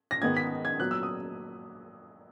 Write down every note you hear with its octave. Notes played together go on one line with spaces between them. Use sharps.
A#6
G#2 D#3 G#3 B3 G#6
B6
G#6
A#2 F#3 B3 F#6
E6
D#6